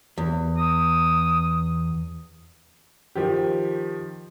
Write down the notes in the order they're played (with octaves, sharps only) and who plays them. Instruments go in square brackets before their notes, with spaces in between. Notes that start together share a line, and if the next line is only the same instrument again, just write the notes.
[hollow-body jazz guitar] E2
[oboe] D#6
[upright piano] D#3 F3 G4